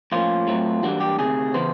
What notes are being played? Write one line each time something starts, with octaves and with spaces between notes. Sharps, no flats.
A2 F3 A#3 C#4 F4
A2 F#3 A3 C4
G#2 E3 G3 A#3 D4 F#4
G4
D2 C3 D#3 G#4
C#3 E3 B3 C5